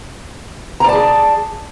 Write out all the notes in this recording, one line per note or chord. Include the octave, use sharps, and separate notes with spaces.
G#4 D5 A5 A#5